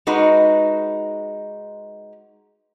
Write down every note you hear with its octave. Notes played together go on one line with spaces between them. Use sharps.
G#3 D#4 F#4 B4